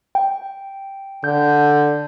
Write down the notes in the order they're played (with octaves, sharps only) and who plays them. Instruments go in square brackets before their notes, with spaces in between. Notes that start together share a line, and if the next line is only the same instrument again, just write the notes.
[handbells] G5
[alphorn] D3 [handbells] G6